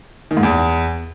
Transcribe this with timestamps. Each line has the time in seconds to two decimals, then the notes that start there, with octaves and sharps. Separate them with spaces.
0.31 D#3
0.37 G#2
0.43 E2